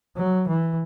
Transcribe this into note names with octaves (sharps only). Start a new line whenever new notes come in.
F#3
E3